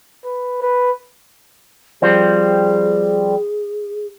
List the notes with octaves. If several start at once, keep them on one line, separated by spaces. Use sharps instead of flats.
B4
B4
F3 G3 C4 G#4